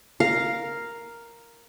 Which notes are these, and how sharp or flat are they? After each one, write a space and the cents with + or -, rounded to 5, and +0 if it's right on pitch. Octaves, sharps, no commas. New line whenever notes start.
A#4 +0 F5 +0